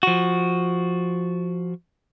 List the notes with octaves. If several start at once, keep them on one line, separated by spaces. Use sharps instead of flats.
F3 F#4